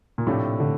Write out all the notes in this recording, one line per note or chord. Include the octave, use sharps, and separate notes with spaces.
A#2
A2 C3 F3 A3 D4
D3